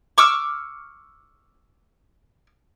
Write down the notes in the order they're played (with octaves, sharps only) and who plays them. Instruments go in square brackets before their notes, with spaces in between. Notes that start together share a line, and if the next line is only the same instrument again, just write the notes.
[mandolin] C#6 D6 E6 F6